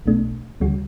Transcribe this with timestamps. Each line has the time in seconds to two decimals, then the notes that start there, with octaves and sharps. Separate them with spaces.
0.06 B1 B2 A3 D4
0.60 D2 C#3 G3 C#4 F#4